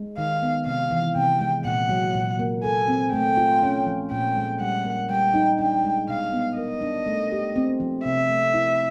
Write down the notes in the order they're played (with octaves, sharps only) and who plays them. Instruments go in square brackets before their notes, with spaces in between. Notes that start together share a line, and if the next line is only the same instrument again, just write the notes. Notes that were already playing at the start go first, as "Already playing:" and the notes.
Already playing: [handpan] G#3
[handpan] D#3 [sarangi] F5
[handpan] B3
[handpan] C3 [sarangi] F5
[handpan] E3
[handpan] C3 [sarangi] G5
[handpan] G#3
[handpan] A#2 [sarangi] F#5
[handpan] F#3
A#2
A#3
[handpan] A4 [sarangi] G#5
[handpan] C4
[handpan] A3 [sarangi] G5
[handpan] F4
C#4
F3
[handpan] A#2 [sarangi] G5
[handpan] G#3
[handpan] G3 [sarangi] F#5
[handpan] A#3
[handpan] G3 [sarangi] G5
[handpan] D#4
[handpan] D4 [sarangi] G5
[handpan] G#3
[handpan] B2 [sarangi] F5
[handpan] B3
[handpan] A#4 [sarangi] D#5
[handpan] D4
A3
G4
C4
F3
[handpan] C3 [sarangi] E5
[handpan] A3
E4